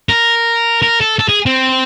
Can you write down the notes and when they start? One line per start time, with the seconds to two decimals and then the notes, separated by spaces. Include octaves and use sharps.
0.09 A#4
0.82 A#4
1.01 A4
1.19 A4
1.29 G#4
1.46 C4